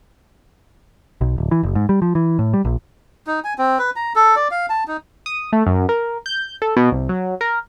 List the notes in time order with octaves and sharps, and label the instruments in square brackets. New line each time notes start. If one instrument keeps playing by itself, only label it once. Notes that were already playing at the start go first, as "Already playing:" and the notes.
[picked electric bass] B1
D1
E3
F#1
G#2
G3
F3
E3
A2
G3
A#1
[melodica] D#4
G#5
C4
B4
A#5
A4
D5
F5
A5
D#4
[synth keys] D#6
A3
F#2
A#4
G6
A4
B2
C2
F#3
A#4